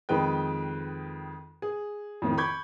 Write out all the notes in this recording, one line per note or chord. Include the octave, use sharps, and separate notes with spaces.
F2 D#3 G#3 B4 G5
G#4
F2 A2 D#3
B5 C#6 D6 G6 G#6